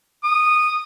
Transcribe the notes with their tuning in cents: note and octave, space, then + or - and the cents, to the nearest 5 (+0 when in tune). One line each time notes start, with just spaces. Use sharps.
D#6 -15